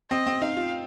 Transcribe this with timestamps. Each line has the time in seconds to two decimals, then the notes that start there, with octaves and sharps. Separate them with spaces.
0.11 C4 D#5
0.26 C4
0.42 D#4 F5
0.57 F4